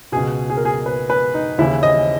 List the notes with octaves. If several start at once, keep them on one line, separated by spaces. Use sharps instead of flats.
C#2 B2 G#4
G#4
A#4
G#4
B4
B4
D#4
D#2 C#3 E3 E4
D#5